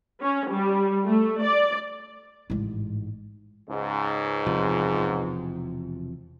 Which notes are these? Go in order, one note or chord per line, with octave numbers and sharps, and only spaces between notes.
C#4
G3
A3
D5
A1 G#2
C#2 G#2
E1 C3 F3